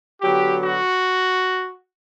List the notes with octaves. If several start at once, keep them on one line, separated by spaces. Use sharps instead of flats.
D3 F#3 B3 G4
F#4